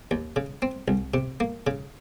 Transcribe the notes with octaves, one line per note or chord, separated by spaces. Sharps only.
D#2
C#3
C4
C2
C3
A#3
C#3